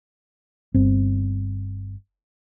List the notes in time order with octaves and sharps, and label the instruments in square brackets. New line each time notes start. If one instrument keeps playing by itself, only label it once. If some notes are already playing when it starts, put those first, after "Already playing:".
[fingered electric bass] G1 C4